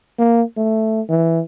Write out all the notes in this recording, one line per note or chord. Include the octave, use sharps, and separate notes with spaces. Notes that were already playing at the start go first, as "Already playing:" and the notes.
A#3
A3
E3